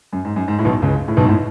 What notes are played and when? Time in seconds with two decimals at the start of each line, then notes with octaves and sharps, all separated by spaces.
0.13 F#2
0.25 G#2
0.36 F#2
0.48 G#2
0.59 A2
0.65 B1 B2
0.82 C#2 C#3
1.08 A2
1.17 B1 B2
1.25 G#2
1.29 A2